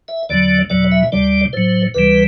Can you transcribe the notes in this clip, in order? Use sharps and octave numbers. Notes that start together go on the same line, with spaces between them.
E5
E2 D3 F#3 D5
E2 B2 F#3 D5
E5
D2 C3 G3 D5
A2 F#3 C5
D2 C3 E3 G3 B4